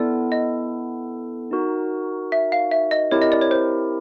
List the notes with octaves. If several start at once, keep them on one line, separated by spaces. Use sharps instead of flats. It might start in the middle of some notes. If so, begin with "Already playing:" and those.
Already playing: B3 E4 A4 D5
D#5
D#4 F#4 A#4
E5
F5
E5
D#5
C4 E4 G4 A#4 C#5
D#5
D5
C#5
C5